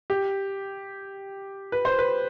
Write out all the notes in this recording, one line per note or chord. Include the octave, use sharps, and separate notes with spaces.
G4
B4
C5
B4